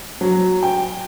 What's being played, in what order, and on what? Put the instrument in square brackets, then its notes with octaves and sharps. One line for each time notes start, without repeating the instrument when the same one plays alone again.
[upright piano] F#3
G5